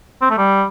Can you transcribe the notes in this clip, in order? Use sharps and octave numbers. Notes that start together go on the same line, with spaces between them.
C4
A3
G3